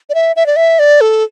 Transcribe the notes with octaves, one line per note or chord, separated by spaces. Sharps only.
D5
E5
E5
D5
E5
D5
A4